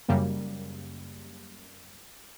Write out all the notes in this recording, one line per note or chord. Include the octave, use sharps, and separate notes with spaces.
F#2 C#3 G3 A#3